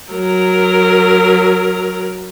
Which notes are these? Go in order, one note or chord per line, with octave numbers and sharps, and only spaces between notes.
F#3 A#4